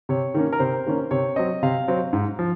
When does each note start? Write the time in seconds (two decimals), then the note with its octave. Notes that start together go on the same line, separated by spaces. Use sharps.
0.09 C3 C#5
0.34 D#3 A#3 C#4
0.53 A#4
0.60 C3 C5
0.86 D#3 A#3 C#4
1.11 C3 C#5
1.36 F#3 C4 D#5
1.63 C3 F5
1.88 F#3 C4
2.13 G#2
2.39 F3